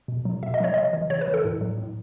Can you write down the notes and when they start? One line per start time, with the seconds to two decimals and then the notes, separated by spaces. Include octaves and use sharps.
0.08 B2
0.25 F#3
0.43 B2 E5
0.54 D#5
0.60 F#3 C#5
0.74 C#3 D#5
0.93 E3
1.10 C#3 C#5
1.21 B4
1.28 E3
1.34 A4
1.45 A2
1.61 F#3
1.78 A2